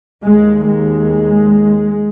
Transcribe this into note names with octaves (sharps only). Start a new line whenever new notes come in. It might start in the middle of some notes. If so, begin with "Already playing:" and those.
D#2 G#3
G#3